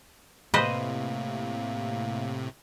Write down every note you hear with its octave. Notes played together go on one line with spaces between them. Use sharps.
A2 C3 A#3 B4 C5 D#5